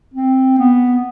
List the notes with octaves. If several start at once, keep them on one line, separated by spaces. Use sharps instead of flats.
C4
B3